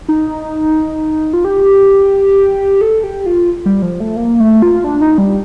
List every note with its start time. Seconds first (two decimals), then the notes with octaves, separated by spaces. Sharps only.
0.09 D#4
1.33 F4
1.45 G4
2.81 A4
3.04 G4
3.26 F4
3.66 G3
3.82 F3
4.00 A3
4.16 A#3
4.40 A3
4.62 F4
4.84 D4
5.01 D#4
5.18 G3